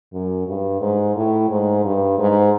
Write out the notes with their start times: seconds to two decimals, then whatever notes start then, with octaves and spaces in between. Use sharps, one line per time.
0.13 F#2
0.47 G2
0.81 G#2
1.16 A2
1.49 G#2
1.84 G2
2.18 G#2